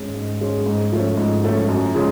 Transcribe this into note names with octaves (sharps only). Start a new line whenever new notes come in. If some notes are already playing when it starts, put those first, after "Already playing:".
Already playing: G#2 G#3 C#4
G#2
G#3 C#4
G#2
F3 A3 C#4
G#2
F3 A3 C#4
F#2
C#3 F3 G#3